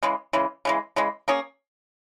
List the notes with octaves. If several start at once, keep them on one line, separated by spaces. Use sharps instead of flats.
C#3 E3 G#3
C#3 E3 G#3
C#3 E3 G#3
C#3 E3 G#3
A#3 C#4 G#4